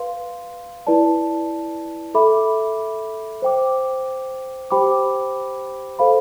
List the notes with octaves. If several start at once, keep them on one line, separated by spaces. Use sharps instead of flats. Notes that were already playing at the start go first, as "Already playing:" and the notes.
Already playing: B4 F5 C6
E4 B4 D5 A5
A4 E5 B5 D6
C5 G5 D6
G4 C5 G5 B5 D6
A4 C5 F5 B5